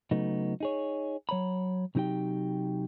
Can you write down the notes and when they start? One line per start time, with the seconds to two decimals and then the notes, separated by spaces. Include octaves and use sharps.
0.11 C#3 F#3 A3 B3 D#4
0.60 D#4 G#4 C#5
1.29 F#3 C#5 A#5 B5
1.95 C3 F#3 D#4 G4 G5